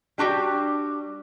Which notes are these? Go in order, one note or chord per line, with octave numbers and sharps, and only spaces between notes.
G3 D4 F#4 G4